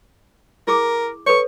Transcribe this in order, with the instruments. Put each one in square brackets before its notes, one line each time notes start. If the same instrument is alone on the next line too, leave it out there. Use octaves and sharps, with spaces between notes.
[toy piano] E4 G#4 D6 [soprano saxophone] A#4
[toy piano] A4 B4 C#5 [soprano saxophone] C#6